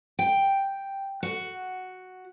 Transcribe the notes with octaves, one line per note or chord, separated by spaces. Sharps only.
G5
F#4